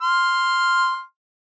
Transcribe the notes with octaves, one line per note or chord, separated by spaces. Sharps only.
C6 F6